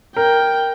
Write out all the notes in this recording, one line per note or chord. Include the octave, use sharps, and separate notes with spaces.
A#4 G5